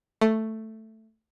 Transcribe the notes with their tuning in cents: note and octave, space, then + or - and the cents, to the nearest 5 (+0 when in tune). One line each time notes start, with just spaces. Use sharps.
A3 +5